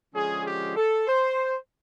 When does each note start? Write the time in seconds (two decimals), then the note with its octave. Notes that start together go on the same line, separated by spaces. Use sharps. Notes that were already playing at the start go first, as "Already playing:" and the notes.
0.14 D3 F3 G#3 C#4 G#4
0.45 G4
0.76 A4
1.07 C5